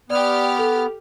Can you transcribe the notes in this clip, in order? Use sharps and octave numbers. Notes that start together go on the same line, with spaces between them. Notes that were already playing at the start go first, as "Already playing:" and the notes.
B3 G4 D5 F6
A4